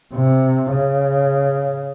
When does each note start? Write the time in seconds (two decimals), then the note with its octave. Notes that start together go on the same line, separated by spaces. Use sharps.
0.15 C3
0.71 C#3